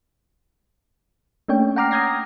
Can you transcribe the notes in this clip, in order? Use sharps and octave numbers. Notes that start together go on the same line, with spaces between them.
A3 A#3 C#4 D4 C#5 G5
F#5 G5 A#5 D6 F6 C7
D#6 F6 G6 G#6 A#6 C7